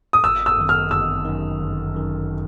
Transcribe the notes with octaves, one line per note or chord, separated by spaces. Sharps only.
D#6
G1 E6
E6
F#2 D#3
F6
G1 E6
F#2 D#3
G1
F#2 D#3